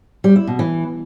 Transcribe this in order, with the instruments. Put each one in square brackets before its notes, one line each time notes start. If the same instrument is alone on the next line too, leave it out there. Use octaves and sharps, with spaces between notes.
[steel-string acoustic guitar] G3
E4
B2
E3